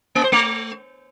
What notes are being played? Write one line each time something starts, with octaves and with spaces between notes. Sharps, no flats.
A#3
C5
A3